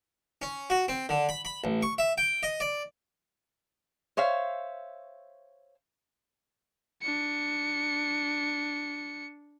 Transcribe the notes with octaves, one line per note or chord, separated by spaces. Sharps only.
C#4
F#4
C4
D3
B5
B5
A1
C#6
E5
G5
D#5
D5
C5 C#5 E5 F5
D4 C#7